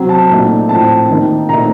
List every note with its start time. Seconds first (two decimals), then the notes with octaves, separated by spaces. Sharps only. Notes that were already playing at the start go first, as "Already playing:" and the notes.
Already playing: C3 F#3 C4
0.09 A5
0.30 A#2 A3 D#4
0.69 A2 F3 C4 A5
1.09 D#3 A#3 D#4
1.49 A#2 A3 C4 D#4 A#5